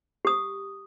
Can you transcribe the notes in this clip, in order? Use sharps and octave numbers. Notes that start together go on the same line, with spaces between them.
G4 D#6